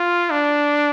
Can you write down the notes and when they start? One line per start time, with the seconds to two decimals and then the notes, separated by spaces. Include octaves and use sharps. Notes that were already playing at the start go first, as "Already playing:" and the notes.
Already playing: F4
0.31 D4